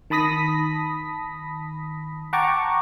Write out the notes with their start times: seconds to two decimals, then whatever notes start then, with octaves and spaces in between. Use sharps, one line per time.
0.10 D#3 A5 B5 D#6 A#6 B6
2.33 F#5 G5 A5 A#5 C#6 D6